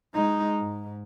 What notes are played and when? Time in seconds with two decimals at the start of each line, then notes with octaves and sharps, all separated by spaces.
0.14 G#3 D#4
0.58 G#2